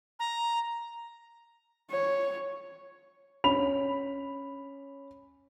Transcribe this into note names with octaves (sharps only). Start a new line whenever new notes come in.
A#5
C#5
C#4 B5 F7